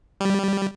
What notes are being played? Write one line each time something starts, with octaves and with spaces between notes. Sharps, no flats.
G3